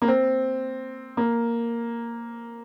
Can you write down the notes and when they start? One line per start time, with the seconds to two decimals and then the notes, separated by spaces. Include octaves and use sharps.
0.02 A#3
0.08 C4
1.17 A#3